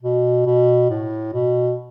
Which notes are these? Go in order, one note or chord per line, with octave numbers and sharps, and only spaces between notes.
B2
B2
A2
B2